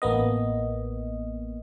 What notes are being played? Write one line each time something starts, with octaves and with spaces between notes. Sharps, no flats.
A1 A#3 B3 D#5